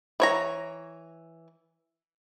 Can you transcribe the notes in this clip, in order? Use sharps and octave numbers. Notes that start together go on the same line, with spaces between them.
E3 C#5 A#5